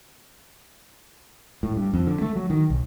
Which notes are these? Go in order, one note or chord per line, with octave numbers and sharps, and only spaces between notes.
A2
G2
F2
D3
A3
F#3
D#3
B1